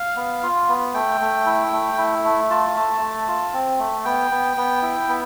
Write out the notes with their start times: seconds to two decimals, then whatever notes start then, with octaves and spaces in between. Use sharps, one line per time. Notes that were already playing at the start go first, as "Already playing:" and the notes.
Already playing: F5
0.16 B3
0.43 F4
0.69 B3
0.94 A3 G5
1.21 A3
1.46 E4
1.72 A3
1.98 E4
2.24 A3
2.50 F4 A5
2.76 A3
3.01 A3
3.28 F4
3.53 C4
3.79 A3
4.05 B3 G5
4.31 B3
4.57 B3
4.82 E4
5.09 B3